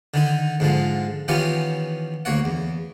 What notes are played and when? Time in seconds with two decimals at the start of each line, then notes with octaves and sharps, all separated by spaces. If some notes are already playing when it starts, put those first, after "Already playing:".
0.14 D3 D#3 D#4
0.60 G#2 D3 F3 G#3
1.28 D#3 E3 B3 C#4 F4 G4
2.25 D2 A#3 C#5 F#5
2.45 E2